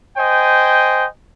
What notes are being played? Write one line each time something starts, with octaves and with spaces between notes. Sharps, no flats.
C5 D#5 G5 G#5